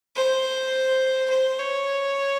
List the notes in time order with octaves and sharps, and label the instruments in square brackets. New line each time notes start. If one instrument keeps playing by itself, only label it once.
[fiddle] C5
C5
C#5